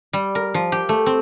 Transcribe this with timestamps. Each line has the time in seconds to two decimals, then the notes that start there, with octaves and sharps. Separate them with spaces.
0.13 G3
0.35 A#4
0.54 F3
0.72 G4
0.89 A3
1.06 C4